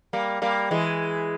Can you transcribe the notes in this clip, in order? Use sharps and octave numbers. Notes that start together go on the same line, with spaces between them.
G3 A#3
G3 A#3
E3 G#3